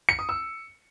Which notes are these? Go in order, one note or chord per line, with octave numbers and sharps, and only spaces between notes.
C#7
D#6
E6